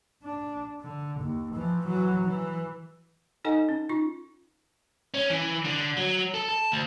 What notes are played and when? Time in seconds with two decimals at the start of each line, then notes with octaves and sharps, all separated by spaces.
0.23 D4
0.81 D3
1.21 D#2
1.55 E3 F3
1.86 E3 F#3
2.24 E3
3.45 D#4 A4 D#5 F#5 G#5
3.69 C#4
3.89 D#4 F4 C#6
5.14 C#4
5.30 E3
5.65 D3
5.97 F#3
6.34 A4
6.49 A5
6.72 D2